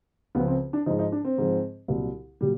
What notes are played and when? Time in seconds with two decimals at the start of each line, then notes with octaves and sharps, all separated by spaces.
0.35 C#2 C#3 F3 B3
0.48 C4
0.73 D4
0.86 G#2 F3 D#4
0.99 D#4
1.12 D4
1.25 C4
1.38 G#2 F3
1.88 C2 A#2 F#3
2.41 A#2 F#3 G3